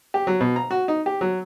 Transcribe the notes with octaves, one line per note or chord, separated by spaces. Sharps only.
G4
F#3
B2
A#5
F#4
D#4
G4
F#3